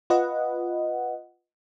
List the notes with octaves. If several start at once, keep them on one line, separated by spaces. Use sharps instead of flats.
F4 B4 D#5 F#5